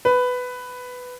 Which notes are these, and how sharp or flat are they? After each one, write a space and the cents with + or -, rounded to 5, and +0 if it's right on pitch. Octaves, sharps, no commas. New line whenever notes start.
B4 +10